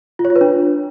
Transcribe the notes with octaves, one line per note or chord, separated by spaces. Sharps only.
F4
C#5
F4
B4
D4